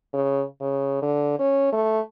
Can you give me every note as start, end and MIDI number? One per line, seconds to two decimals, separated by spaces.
0.13 0.43 49
0.61 1.01 49
1.02 1.34 50
1.39 1.70 61
1.72 2.00 57